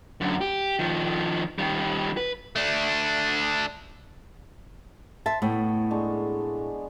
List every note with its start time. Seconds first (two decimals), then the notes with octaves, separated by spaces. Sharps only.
0.21 F#2 D3
0.41 G4
0.79 D#3 F3
1.59 D#3 G3
2.17 B4
2.56 A3 D4
5.26 C5 E5 A5
5.42 A2 A3 B3 C#5 G5
5.91 G#3 D4 C#6